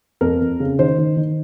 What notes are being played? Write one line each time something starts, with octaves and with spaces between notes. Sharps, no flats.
F2 A#4
F2
C#3
D#3 C5
D#3
D#3